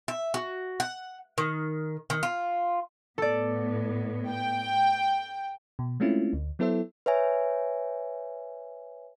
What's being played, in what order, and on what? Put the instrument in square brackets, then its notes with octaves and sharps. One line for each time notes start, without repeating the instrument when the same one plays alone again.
[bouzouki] E5
F#4
F#5
D#3
D#3
F4
[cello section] A2 B3 [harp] A4 D5
[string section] G5
[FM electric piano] B2
G#3 A3 C4 C#4 E4 F4
D2
F#3 B3 E4 A4 C5 E5
[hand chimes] B4 C#5 E5 G#5